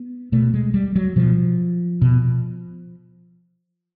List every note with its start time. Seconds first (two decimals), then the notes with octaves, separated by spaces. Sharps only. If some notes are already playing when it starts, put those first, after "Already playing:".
Already playing: B3
0.32 B2 A3
0.54 G#3
0.74 G3
0.96 F#3
1.16 B2 F3
2.02 B2